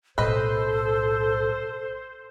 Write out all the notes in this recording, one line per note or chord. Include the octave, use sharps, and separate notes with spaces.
B1 A2 A4 B4 C5 D#5